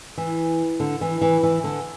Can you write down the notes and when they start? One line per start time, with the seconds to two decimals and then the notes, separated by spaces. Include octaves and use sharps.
0.17 E3
0.80 D3
1.01 E3
1.21 E3
1.43 E3
1.64 D3